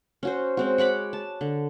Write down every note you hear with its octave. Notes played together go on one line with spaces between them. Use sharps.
C#4 F#4 C5
G#3 C4 F#4
C#5 F#5 B5 D6
A5
D3